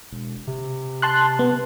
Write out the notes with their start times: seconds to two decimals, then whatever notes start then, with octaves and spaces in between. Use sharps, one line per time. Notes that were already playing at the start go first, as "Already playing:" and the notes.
0.11 E1
0.47 C3
1.02 A5 C6 F#6
1.39 B3